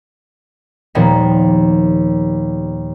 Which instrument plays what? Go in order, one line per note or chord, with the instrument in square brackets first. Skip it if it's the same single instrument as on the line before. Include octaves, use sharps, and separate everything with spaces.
[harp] D#2 A#2 F3 G3 G#3 B3